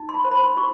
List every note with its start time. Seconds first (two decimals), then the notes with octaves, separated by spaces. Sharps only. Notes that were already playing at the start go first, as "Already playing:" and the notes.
Already playing: D#4
0.09 C6
0.14 B5
0.25 C5
0.31 B5
0.35 C6
0.57 F#4 C#6